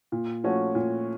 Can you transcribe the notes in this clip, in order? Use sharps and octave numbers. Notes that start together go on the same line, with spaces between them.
A#2
F3 A3 C#4 F#4
A#2